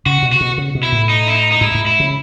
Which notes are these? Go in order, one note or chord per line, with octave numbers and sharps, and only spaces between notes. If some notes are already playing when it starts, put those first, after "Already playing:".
C#3 F#4
B2
F#4
B2
C#3
B2
E4
A2
D#4
E4
D#4
D#4
G#2 E4
G#2
E4
C#3